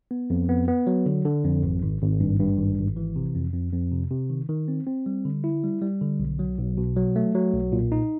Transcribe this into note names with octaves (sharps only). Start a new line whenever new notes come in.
B3
F2
B3
B3
F#3
D3
D3
F2
G#1
G#1
G#1
G2
G2
G#1
G#1
E3
C3
F2
F2
F2
C3
C3
D#3
D#3
C4
C4
G3
D3
E4
G3
G3
D3
B1
F#3
B1
B2
F#3
A3
F#3
B1
A#2
D#4